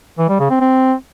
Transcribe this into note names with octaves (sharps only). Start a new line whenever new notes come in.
E3
G3
C#3
C4
C4